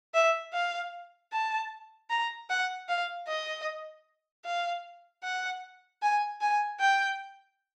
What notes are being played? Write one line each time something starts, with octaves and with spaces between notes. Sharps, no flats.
E5
F5
A5
A#5
F#5
F5
D#5
F5
F#5
G#5
G#5
G5